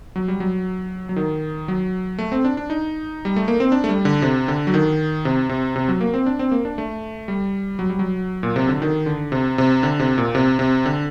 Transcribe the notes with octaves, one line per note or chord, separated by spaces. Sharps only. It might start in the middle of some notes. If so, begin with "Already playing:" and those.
F#3
G3
F#3
F#3
D#3
F#3
A3
C4
D4
D4
D#4
G3
A3
A#3
C4
D4
A3
G3
D3
C3
D3
F#3
D#3
C3
C3
C3
F#3
A#3
C4
D4
C4
A#3
D4
A3
G3
F#3
G3
F#3
A#2
C3
D3
D#3
D3
C3
C3
D3
C3
A#2
C3
C3
D3